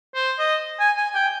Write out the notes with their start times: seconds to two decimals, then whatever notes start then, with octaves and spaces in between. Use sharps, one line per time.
0.15 C5
0.39 D#5
0.80 G#5
0.97 G#5
1.15 G5